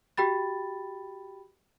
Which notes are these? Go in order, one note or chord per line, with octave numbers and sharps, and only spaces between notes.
F#4 G4 G5 B5 A6